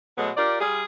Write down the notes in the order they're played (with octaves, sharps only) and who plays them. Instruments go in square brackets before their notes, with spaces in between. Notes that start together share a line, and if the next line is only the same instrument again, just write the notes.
[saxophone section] B2 F#3 G#3 A3 B3
F4 G4 A#4 D5
G3 F4 G#4